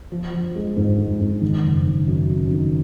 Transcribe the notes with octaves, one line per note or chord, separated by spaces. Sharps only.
F3
F3
G#3
G#2
G#2
G#2
D#3
F#1
D#3
F#2
F#2
D#3